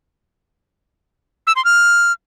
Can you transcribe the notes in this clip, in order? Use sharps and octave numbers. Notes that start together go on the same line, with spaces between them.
E6
C6
F6